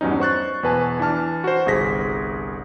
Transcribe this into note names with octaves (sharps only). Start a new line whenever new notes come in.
E2 G2 F#3 C#4 D#4
C5 C#6 F#6 A6
E2 B2 B4 G#5 A5
E3 D4 A5 F6
F#4 C5
G1 C2 G#4 A#6 B6